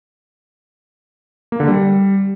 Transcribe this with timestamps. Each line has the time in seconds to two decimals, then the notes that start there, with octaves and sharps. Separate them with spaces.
1.52 A#3
1.60 D3
1.68 G3